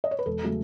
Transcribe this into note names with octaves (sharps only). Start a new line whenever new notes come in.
D#5
C#5
B4
E1 A4
C#3 F#3 A3